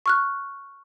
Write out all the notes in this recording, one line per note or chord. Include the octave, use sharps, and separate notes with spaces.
C#6 F6 F#6